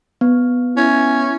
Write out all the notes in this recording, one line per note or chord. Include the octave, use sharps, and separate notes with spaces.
B3
C#4 E4